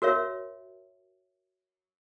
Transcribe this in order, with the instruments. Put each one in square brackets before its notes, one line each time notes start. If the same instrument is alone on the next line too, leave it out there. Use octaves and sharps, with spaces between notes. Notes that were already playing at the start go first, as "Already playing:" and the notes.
[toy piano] F#4 A#4 C#5 E5